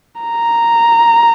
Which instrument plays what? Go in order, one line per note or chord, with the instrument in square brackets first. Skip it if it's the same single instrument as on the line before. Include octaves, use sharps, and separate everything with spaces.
[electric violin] A#5